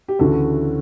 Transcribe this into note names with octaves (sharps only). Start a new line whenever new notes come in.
G4
D2 C#3 E3 F#4 A4